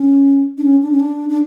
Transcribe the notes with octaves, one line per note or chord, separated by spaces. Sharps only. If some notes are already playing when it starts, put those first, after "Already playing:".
Already playing: C#4
D4
C#4
D4
C#4
D4
D4